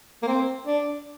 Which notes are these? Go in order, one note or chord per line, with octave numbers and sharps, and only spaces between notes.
A#3
C4
D4